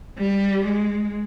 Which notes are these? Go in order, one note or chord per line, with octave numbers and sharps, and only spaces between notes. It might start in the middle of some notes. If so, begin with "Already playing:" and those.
G3
G#3